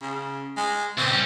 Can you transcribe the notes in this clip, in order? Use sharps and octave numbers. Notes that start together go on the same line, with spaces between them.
C#3
G#3
C#2 C4
G3 C#4